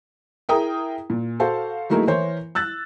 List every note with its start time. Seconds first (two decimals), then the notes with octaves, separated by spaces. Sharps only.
0.49 E4 G#4 A#4 G5 A#5 D#6
1.10 A#2
1.40 F#4 A4 C5 F5
1.90 F#3 A3 A#3 D#4 E4 G#4
2.07 E3 A#4 C5 C#5
2.55 E6 F#6 A6